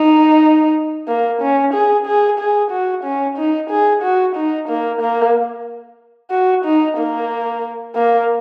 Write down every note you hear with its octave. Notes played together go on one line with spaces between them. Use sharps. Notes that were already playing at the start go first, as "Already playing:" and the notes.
Already playing: D#4
A#3
C#4
G#4
G#4
G#4
F#4
C#4
D#4
G#4
F#4
D#4
A#3
A#3
F#4
D#4
A#3
A#3